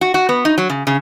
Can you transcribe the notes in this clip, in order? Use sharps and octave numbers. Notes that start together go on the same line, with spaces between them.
F#4
F#4
B3
D#4
F#3
C#3
C#3